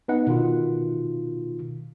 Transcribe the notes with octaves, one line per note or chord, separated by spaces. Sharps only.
B3 D#4 B4 D#5 F#5
B2 D#3 F4